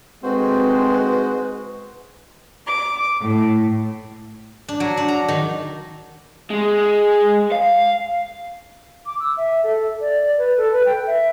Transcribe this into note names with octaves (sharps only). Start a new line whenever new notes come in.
D2 D#3 G#3 C4 F#4 B4 C5
D6
A2
D4
F#3
D4
A#5
D#3
G#3
F5
D6
E6
E5
A4
D5
B4
A4
B4
G5
E5